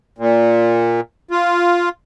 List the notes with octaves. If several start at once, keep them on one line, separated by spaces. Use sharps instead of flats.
A#2
F4